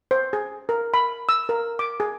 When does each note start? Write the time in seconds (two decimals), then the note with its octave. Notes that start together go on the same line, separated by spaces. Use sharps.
0.11 C5
0.33 G#4
0.69 A#4
0.94 B5
1.29 E6
1.49 A#4
1.79 D6
2.00 G#4